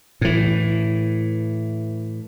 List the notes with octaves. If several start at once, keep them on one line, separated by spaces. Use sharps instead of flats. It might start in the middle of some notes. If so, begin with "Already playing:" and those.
A2 E3